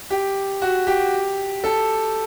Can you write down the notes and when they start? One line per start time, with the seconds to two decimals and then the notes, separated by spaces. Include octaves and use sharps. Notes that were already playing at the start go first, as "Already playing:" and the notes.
0.10 G4
0.62 F#4
0.87 G4
1.64 A4